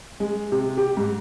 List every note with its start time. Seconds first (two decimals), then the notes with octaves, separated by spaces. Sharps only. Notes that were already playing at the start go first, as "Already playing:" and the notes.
0.20 G#3
0.52 C3
0.77 G4
0.97 G#2